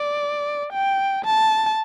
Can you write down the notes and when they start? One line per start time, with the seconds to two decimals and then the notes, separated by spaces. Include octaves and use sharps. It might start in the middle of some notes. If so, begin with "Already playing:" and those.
Already playing: D5
0.73 G5
1.25 A5